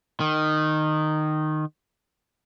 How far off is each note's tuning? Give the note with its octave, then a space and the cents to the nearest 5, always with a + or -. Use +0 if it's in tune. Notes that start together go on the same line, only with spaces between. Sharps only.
D#3 -15